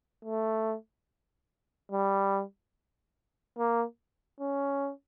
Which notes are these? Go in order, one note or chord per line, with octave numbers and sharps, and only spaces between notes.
A3
G3
A#3
C#4